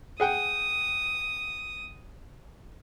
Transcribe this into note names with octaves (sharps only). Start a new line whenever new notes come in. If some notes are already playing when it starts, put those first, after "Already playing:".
G#4 F#5 G5 D#6